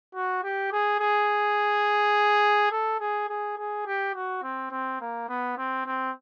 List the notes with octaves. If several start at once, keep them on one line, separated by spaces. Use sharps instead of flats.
F#4
G4
G#4
G#4
A4
G#4
G#4
G#4
G4
F#4
C4
C4
A#3
B3
C4
C4